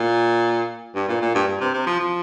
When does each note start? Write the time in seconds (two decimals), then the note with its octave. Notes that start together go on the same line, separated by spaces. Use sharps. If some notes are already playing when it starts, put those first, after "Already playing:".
Already playing: A#2
0.95 G2
1.09 A#2
1.21 A#2
1.35 G2
1.48 G2
1.61 C3
1.74 C3
1.87 F3
2.00 F3